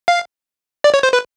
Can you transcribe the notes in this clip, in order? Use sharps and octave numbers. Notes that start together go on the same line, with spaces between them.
F5
D5
C#5
C5
B4